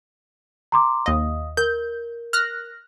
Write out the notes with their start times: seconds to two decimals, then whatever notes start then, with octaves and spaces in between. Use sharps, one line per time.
0.72 A#5 C6 D6
1.06 D#2 D#5 F5 D#6
1.57 A#4 G6
2.33 F6 F#6 A#6